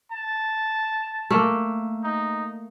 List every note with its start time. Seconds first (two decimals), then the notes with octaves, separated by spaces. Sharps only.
0.12 A5
1.30 A3 A#3
2.04 D#4